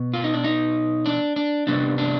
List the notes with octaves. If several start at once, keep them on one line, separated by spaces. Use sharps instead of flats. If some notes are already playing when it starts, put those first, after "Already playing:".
Already playing: B2 B3
F4
D#4
D4
D#4
D4
D4
C3 G3 B3 D4
D4